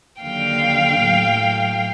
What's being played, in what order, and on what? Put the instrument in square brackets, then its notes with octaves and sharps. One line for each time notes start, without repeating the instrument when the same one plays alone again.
[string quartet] D#2 D3 F#3 F5 G5
A2 F#3